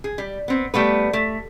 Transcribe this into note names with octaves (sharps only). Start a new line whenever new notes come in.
G#4
G3
B3 C4
G3 A3 B3 B4
A3